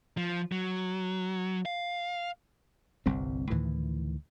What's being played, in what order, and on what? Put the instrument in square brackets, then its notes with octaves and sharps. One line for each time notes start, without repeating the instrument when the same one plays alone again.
[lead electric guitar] F3
F#3
F5
[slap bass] G1 C2 G3 C4
D2 A2 D#3 E3